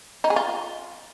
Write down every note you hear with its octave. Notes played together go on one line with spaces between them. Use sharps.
D#4
G#4
F4